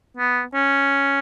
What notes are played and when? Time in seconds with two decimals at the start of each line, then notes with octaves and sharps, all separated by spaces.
0.17 B3
0.54 C#4